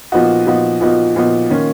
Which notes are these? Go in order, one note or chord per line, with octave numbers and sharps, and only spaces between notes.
A#2 F3 B3 D#4 F#4
A#2 F3 B3 D#4 F#4
A#2 F3 B3 D#4 F#4
A#2 F3 B3 D#4 F#4
D#3 A#3 C#4 F4